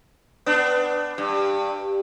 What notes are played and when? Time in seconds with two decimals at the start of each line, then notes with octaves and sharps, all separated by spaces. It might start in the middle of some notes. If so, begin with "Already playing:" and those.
0.46 B3 D4
1.18 G2